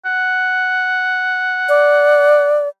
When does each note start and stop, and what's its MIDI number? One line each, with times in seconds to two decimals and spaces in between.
0.05 2.63 78
1.69 2.68 74